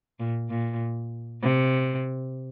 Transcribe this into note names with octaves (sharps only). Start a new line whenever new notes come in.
A#2
A#2
C3